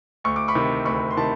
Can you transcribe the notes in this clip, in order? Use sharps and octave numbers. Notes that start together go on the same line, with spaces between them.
D2 C#6
D6
B5 C#6
C3 D#3
D2 B5 C#6
C6
C3 D#3 A5 B5